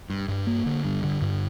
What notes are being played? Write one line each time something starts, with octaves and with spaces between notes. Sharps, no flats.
G2
G2
A#3
D3
G2
D3
G2